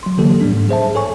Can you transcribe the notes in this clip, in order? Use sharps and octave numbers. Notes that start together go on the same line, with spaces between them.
F#3 C6
D3 E3 F#3 A#3 G4 A4
A2 G3 B3 D4
G#2
G#4 C5 E5 A5
A4 C#5 G#5 C#6